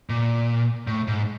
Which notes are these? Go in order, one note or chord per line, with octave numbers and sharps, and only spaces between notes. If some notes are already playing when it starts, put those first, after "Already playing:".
A#2
A2
G#2